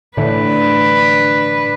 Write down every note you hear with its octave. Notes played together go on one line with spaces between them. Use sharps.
A2 D3 E3 D4 B4